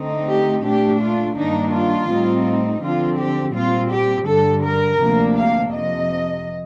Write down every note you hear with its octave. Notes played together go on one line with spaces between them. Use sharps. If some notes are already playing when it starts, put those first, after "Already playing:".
Already playing: D3 A3 C4 D#4
G4
A#2 A3 D4 G4
F4
G2 D#3 A#3 D4 D#4
F4
A2 G3 C4 D#4
D3 F3 C4 F4
G4
A#2 G3 C4 F4
G4
G2 D3 G3 A4
A#4
D2 C3 F3 A#3 D4
F5
F2 C3 F3 D#5